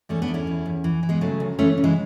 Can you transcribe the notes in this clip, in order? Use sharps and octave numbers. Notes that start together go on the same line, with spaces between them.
E2 A3 C#4
B3 D4
E2
C#4 E4
E2
E2
E3
E3
G#3 B3
C#3 F#3 A3
D2
E3 A3 C#4
C#3
E3 G#3